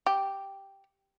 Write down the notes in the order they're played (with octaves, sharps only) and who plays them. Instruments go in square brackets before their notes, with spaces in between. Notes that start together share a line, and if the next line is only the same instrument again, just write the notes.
[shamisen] G4